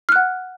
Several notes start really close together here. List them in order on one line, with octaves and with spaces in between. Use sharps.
F6 F#6 F#5